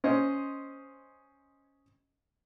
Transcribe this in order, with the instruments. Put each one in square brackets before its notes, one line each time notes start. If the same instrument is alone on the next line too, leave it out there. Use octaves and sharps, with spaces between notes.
[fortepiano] C#4 C5 D#5